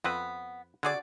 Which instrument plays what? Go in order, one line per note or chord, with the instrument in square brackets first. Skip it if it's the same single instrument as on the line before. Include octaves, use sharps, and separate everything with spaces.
[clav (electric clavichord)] F2 C4 B4 [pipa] B3
[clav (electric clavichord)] D3 G#4 [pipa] D4 F#4 D5